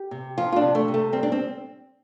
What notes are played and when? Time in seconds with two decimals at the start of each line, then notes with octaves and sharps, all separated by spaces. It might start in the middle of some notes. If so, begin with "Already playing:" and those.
Already playing: G4
0.11 C3
0.38 F3 F4
0.52 F4
0.56 D4
0.62 C3
0.75 A3
0.88 C3
0.94 A3
1.12 G3 C4
1.23 D4
1.32 C4